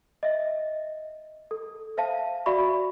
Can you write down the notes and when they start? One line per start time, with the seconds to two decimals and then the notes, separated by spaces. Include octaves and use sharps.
0.23 D#5 E5
1.51 A4
1.97 C5 E5 F5 A5
2.46 F#4 D5 E5 B5 C#6